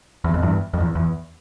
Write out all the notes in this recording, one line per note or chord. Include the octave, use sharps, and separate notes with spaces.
E2
F2
E2 G2
F2
E2
E2